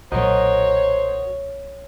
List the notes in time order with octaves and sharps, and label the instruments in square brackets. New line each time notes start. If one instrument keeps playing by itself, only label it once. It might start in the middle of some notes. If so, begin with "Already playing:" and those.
[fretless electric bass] B1 A#2 F#3 [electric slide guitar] F#4 A#4 D#5 [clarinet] C5 [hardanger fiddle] C#5